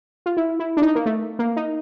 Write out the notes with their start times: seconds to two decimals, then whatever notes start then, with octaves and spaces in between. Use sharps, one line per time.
0.26 F4
0.37 E4
0.59 E4
0.77 D4
0.82 D#4
0.95 A#3
1.06 A3
1.39 A#3
1.56 D#4